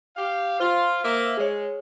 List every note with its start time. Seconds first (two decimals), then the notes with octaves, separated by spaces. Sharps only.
0.16 G4 F5
0.60 F4 C5 F6 G7
1.04 A#3 E5
1.37 G#3 G#4 C#5